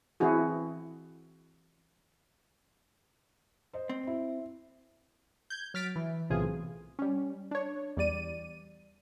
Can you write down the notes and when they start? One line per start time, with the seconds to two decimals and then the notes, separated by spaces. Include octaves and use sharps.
0.20 E3 C4 E4 F#4 G#4
3.73 C5 D#5
3.89 C4
4.07 E4
5.50 G6 G#6
5.74 F#3 F6 A6 B6 D7
5.96 E3
6.30 B1 A2 C3 E3 F4 G#4
6.99 G3 C#4
7.51 D4 C#5
7.97 E2 G3 D5 D#7